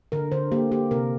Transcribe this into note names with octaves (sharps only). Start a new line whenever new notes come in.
D3 A#4
D3 C5
A#3 G4
A#3 G4
C3 A#4